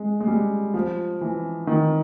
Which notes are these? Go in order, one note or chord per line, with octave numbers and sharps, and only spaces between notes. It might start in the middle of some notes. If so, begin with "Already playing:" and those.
Already playing: G#3
G#3
G3
F3
E3
D#3